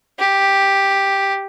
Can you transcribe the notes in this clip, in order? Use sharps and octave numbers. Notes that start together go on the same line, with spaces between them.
G4